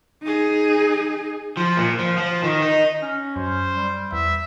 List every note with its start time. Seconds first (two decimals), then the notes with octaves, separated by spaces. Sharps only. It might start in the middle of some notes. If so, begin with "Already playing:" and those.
0.23 D#4 G#4
1.57 F3
1.77 A#2
1.99 F3
2.18 F3
2.44 D#3
2.62 D#4
3.02 C#4
3.36 F#2 C5
3.74 G3
4.12 E2 E5